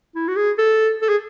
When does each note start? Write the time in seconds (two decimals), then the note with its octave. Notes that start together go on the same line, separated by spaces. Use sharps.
0.15 E4
0.28 F#4
0.36 G#4
0.58 A4
1.02 A4
1.09 G#4